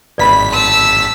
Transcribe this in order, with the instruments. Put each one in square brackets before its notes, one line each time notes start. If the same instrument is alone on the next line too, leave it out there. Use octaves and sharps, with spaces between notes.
[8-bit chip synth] G#1 B6 [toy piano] D5 E5 B5
[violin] A5 E6 [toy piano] C6